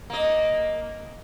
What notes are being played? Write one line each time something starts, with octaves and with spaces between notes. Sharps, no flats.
A#3 D#5